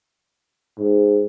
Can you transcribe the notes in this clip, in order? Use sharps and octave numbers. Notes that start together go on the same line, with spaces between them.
G#2